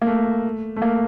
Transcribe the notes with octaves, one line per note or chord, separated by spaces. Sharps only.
A#3
A3
A3
A#3